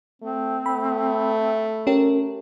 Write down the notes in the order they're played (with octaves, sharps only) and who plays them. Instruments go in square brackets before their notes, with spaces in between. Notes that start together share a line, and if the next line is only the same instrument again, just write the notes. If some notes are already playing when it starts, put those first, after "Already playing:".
[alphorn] A3 [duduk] C4
[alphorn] A3 [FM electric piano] B5
[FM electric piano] C#4 G4 A#4